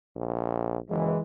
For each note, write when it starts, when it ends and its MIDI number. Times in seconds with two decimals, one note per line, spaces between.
0.16 0.78 34
0.90 1.14 30
0.90 1.19 52
0.90 1.19 56